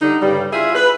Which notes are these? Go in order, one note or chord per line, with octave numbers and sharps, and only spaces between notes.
D3 G3 D#4
G2 C#3 G3
E4 F4 G#4 E5
B4